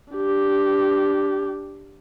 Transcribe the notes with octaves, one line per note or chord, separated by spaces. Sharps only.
D4 G4